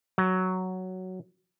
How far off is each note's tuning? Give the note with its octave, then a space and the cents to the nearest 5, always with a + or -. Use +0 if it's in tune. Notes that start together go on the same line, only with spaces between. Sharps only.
F#3 +5